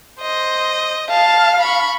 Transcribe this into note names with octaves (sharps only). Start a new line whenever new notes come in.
C5 D#5
F5 A5
B5 C#6